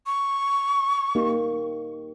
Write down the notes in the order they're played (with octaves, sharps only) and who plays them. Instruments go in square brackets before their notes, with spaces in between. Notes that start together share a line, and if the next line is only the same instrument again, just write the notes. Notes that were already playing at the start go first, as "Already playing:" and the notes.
[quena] C#6
[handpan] A#3 D#4 G4